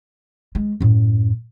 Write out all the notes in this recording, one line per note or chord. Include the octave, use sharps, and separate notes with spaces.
G#3
F#2 A2